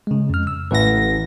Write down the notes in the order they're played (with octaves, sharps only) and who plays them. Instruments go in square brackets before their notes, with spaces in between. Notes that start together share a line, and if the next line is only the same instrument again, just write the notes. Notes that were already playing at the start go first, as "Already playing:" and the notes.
[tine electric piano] C#3 G#3
F2 F6
E6
[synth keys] A1 E3 A#6 [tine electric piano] B4 F5 F#5